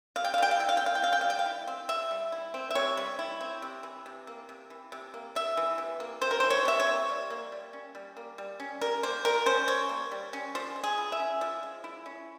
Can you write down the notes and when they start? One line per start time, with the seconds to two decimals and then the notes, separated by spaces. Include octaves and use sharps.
0.16 C3 F5
0.24 G5
0.34 F5
0.38 G3 G5
0.51 F5
0.59 E4 G5
0.69 F5
0.77 G5
0.81 C4
0.86 F5
0.95 G5
1.02 C3 F5
1.12 G5
1.21 G3 F5
1.30 G5
1.39 F5
1.46 E4
1.68 C4
1.89 C3 E5
2.11 G3
2.32 E4
2.54 C4
2.70 E5
2.75 C3 C#5
2.97 G3
3.19 E4
3.41 C4
3.62 C3
3.83 E3
4.06 C3
4.27 A#3
4.49 C3
4.70 E3
4.92 C3
5.14 A#3
5.35 C3 E5
5.57 E3
5.78 C3
6.00 A#3
6.21 C3 C5
6.31 A#4
6.40 E3 C5
6.50 C#5
6.65 C3 E5
6.80 C#5
6.86 A#3
7.09 G3
7.30 A#3
7.52 G3
7.73 C#4
7.95 G3
8.17 A#3
8.38 G3
8.60 C#4
8.81 G3 A#4
9.03 A#3 C5
9.25 G3 A#4
9.46 C#4 C5
9.68 G3 C#5
9.89 A#3
10.11 G3
10.33 C#4
10.55 F3 C5
10.76 G#3
10.84 G#4
10.98 E4
11.12 E5
11.20 C#4
11.41 F3
11.63 G#3
11.84 E4
12.06 C#4